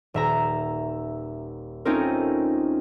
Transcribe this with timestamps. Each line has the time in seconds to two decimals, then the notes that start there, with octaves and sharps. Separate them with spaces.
0.14 D#1 E5 A#5
1.85 A3 C4 C#4 D#4 F4 A#4